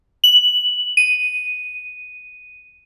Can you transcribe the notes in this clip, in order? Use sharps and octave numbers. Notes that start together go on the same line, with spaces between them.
F#7
D#7